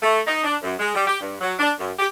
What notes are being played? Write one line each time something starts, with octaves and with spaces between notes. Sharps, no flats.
A3
D#4
D4
F#2
G#3
G3
G4
G2
F#3
D4
F#2
G4